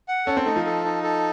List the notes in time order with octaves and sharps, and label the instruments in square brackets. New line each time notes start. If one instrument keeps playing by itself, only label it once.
[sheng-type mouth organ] F#5
[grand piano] C#4 [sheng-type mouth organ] A4
[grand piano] C4
[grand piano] A3 [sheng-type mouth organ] D#4
[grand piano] F3
[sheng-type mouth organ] A4
D#4
A4